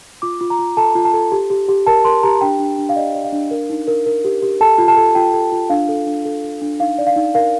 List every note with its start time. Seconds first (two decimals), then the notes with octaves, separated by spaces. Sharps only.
0.22 F4 D6
0.41 F4
0.50 A#5
0.59 F4
0.77 A4 A5
0.95 F4
1.05 A5
1.14 A4
1.32 G4
1.50 G4
1.68 G4
1.87 A#4 A5
2.05 A#4 C6
2.23 G4 A#5
2.41 D4 G5
2.60 D4
2.78 D4
2.89 F5
2.96 D5 D#5
3.15 D5
3.24 F5
3.33 D4
3.51 A#4
3.70 D#4
3.88 A#4
4.06 A#4
4.25 G4
4.42 G4
4.61 A4 A5
4.78 F4
4.88 A5
4.97 A4
5.15 F4 G5
5.34 A4
5.52 F4
5.70 D4 F5
5.89 A4
6.07 D4
6.25 A4
6.43 A4
6.62 D4
6.80 D#4 F5
6.98 D5
7.07 F5
7.16 D#4
7.35 A#4 F5